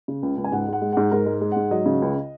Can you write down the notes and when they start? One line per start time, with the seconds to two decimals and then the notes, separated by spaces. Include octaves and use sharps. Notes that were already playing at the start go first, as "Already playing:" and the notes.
0.08 C#3
0.23 C#2
0.38 C#2
0.44 G#5
0.52 G#2 F#5
0.68 G#3
0.73 F#5
0.82 G#3
0.93 G#2 F#5
1.11 G#2 A#4
1.26 G#3
1.41 G#3
1.52 G#2 F#5
1.71 F#3 D#5
1.86 C#3
2.02 C#2